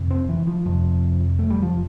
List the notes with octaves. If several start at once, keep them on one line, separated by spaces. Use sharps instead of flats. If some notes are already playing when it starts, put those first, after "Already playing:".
Already playing: F2 C3
C4
E3
F3
F2 C3 F3
A3
G3
F3